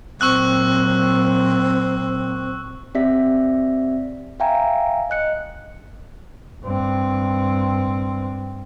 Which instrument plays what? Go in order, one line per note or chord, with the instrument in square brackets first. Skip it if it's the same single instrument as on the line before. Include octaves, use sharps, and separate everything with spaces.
[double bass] A#2 F#3 [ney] C4 [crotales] C#6 E6 F#6
[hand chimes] C4 G4 D5 E5 B6
E5 F5 G5 G#5 A#5
D#5 F#6 C#7
[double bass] G2 C4